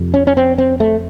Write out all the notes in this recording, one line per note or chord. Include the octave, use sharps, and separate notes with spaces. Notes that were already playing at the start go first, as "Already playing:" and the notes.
Already playing: F2 C3
C#4
C#4
C4
C4
A3